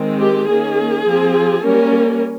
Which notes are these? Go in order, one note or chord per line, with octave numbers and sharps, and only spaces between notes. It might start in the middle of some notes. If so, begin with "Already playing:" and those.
Already playing: D#3 G#3 C4
G4
D#3 A#3 C#4 G#4
F3 C4
G3 A#3 C#4 A#4